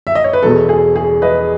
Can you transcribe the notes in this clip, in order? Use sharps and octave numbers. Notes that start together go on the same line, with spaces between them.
E5
D#5
C#5
B4
E1 E2 B2 A4
G#4
G#4
B4 D#5